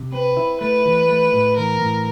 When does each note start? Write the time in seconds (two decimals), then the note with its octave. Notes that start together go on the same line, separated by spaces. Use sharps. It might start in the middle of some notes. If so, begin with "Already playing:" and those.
Already playing: C3
0.12 C4 B4
0.37 E4
0.61 A3 B4
0.85 E3
1.09 A3
1.33 A2
1.57 E3 A#4
1.81 A2